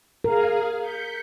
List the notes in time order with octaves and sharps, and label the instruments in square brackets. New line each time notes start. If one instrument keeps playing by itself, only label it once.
[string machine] G#4 F5 [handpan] A#4
[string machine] G6 B6 C#7